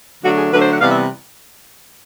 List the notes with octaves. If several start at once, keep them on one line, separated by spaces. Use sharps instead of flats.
D3 F#3 A3 D4 F#4
G#4
D3 F#3 A3 D4 B4
C5
F#5
C3 E3 G3 B3 F5
E5